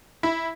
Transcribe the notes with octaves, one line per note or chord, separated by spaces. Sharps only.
E4